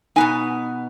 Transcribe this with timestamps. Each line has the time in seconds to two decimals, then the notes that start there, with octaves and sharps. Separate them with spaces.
0.16 B2 B3 D#4 G#5